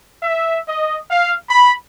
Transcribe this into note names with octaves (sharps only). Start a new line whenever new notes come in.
E5
D#5
F5
B5